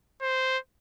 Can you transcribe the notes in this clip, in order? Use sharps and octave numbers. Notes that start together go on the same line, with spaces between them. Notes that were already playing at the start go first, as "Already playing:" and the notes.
C5